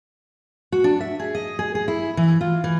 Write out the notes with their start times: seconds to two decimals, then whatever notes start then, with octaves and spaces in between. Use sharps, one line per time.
0.72 F#4
0.84 D4
1.00 E5
1.20 G#4
1.35 D#5
1.59 G#4
1.75 G#4
1.88 E4
2.17 E3
2.41 F4
2.64 E3